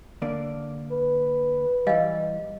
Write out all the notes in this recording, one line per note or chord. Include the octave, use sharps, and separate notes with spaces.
D3 A#3 D5
B4
E3 G3 D#5 F5 G#5